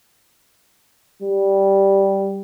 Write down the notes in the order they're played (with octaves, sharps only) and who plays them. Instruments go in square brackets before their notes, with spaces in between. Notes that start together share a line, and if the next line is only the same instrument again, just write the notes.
[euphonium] G3